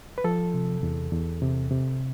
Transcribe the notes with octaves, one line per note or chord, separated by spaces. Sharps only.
B4
F3 A4
C3
E2
E2
C3
C3